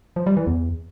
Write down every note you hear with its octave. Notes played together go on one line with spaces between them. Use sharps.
F3
G3
E3
E2